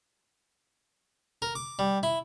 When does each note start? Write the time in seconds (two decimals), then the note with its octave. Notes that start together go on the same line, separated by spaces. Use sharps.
1.42 A#4
1.55 D6
1.79 G3
2.03 E4